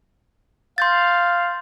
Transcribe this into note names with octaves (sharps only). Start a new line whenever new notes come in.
F5 C6 G6 A6